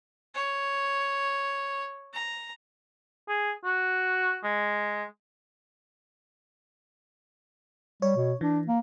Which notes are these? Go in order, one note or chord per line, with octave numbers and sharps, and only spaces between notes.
C#5
A#5
G#4
F#4
G#3
G3 C#5
B2
E3 D4
A#3